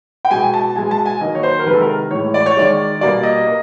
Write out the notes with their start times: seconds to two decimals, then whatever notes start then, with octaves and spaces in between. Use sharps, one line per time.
0.25 G5
0.31 B2 G#3 G#5
0.54 A5
0.76 B2 G#3 G#5
0.91 A5
1.06 G#5
1.21 D#3 F#3 A#3 D#5
1.35 C#5
1.43 C5
1.59 A#4
1.66 C3 D#3 G#3 B4
1.73 A4
1.81 A#4
2.11 A2 E3 G#3 C#5
2.34 D5
2.46 C#5
2.57 D#3 G#3 D5
3.01 B2 G3 A#3 D5
3.23 D#5
3.47 A#3